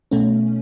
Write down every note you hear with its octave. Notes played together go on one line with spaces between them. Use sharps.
B2 A3 C#4